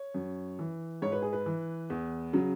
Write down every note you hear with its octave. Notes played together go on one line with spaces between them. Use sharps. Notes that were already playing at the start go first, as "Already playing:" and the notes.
Already playing: C#5
F#2
E3
G#2 C#5
B4
G#4
B4
E3
E2
C#3 F#3